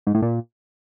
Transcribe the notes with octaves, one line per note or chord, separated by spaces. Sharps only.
G#2
A2
A#2